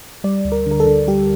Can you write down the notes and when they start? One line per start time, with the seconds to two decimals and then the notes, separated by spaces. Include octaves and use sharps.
0.24 G3 D5
0.45 D2
0.52 A#4
0.66 D3
0.71 A#4
0.80 A4
0.87 D3
1.08 G3 G4